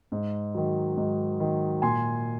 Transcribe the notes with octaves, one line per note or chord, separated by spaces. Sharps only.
G#2
D#3 F#3
G#2
D#3 F#3
A#2 G#5 C6